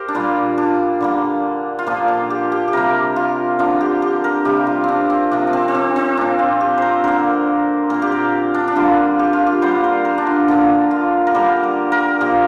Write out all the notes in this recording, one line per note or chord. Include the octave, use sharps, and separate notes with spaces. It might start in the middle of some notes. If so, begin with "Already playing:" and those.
Already playing: G4 A#4 C5
D4
A#2 G3 A#3 F4
D4
D3 G3 A#3
F4
A#2 F3 A#3 D4
D4
G4
G4
G4
C3 G3 A#3 A#4
F4
D3 F3 A#3 D4
G4
G4
A#4
C3 G3 A#3 G4
F4
C4 D4
C4
C3 F3 A#3 D4
D4
C4
C4
D4
C4
A#2 A#3 D4
F4
G4
A#4 C5
D3 A#3 A#4
A#2 A#3 A#4
G4
A#4
D4
D4
D3 G3 A#3 F4
G4
F4
G4
D3 G3 A#3 C5
A#4
A#4
D4
F4
D3 F3 A#3 D4
F4
A#4
D3 G3 A#3 G4
A#4
A#4
A#2 F3 A#3 G4